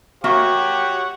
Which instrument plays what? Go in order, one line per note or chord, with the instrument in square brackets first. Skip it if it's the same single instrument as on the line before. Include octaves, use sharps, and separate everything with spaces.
[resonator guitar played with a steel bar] A#3 F#4 E5 [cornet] G4 [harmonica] C#5 F#5